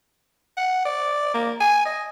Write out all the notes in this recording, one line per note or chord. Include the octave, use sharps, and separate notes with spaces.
F#5
D5
A#3
G#5
D#5